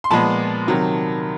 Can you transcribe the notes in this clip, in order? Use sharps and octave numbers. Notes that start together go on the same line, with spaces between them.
C6
A#2 F3 G#3 B3 A5 B5
C3 D#3 F#3